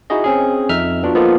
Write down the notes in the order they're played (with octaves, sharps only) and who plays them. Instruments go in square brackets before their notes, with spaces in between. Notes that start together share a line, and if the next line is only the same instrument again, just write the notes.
[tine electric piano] D#4 E4 F#4 G#4 D#5
C4 C#4 G#4
F2 D#4 E5 F6
B3 D4 F4 F#4
F3 A#3 B3 D#4 F4 A4